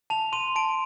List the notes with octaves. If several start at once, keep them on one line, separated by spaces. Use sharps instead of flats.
A5 F7
C6 D#7
A5 D7